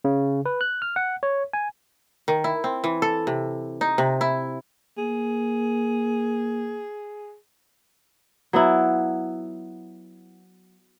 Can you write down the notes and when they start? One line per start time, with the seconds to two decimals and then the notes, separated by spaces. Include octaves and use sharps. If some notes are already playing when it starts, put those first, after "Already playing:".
0.05 C#3
0.46 B4
0.61 F#6
0.82 F6
0.96 F#5
1.23 C#5
1.53 G#5
2.28 D#3
2.44 E4
2.64 C4
2.84 E3
3.02 A4
3.27 C3
3.81 D#4
3.98 C3
4.21 E4
4.98 A#3 G#4
8.53 F#3 B3 E4